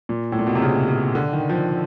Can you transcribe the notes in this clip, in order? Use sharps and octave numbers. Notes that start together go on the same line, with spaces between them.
A#2
A2
A#2
B2
C3
C#3
C#3
D3
D#3
F3